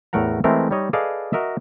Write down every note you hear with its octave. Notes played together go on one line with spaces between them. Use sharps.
E2 A2 A3 A#4 F#5 A#5
E3 G#3 A3 C4 A#4
G3 D#4 C#5 D#5
G#4 A4 B4 D5 D#5 F5
F#4 A#4 D#5 E5